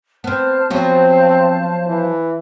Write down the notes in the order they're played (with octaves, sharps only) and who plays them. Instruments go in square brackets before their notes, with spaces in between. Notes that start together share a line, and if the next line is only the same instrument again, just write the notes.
[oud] B3 C4 [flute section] C5 A5 F6
[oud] F3 F#3 B3 [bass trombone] C4 [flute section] C5 F5 A5
[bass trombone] E3